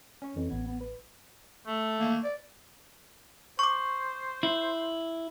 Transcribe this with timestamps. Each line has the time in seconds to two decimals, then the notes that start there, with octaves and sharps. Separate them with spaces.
0.22 C#4 C#5
0.36 F2 E3
0.50 A1 B3 G#6
0.67 B3
0.80 B4
1.67 A3
1.99 A#3
2.24 D5
3.59 C5 C#6 D6
4.43 E4